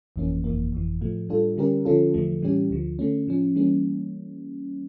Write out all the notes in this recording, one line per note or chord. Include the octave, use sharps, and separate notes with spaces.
G1 F2 E3 A#3 C#4
G1 F2 E3 A#3
G1 F2 E3
A2 F3 A3
A2 G3 D4 F4 A4
D3 G3 C#4 G4 A#4
D3 F3 C#4 F4 A4
E2 D3 F3 A3
A2 E3 G3 C#4 G4
D2 D3 F3
D3 A3 C#4
A2 F3 C#4
E3 G3 A#3 C#4